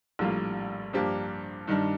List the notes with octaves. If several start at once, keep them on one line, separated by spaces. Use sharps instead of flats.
A#1 A2 G3 A#3 F4
G2 F3 A#3 D4 G4
G2 D#3 G3 D4